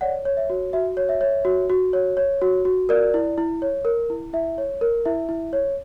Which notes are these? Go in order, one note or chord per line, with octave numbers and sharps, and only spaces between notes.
C#5 D5 F#5
C#5
E5
F#4
F#4 E5
C#5
E5
C#5
F#4
F#4
C#5
C#5
F#4
F#4
A#4 D5
E4
E4
C#5
A#4
E4
E4 E5
C#5
A#4
E4 E5
E4
C#5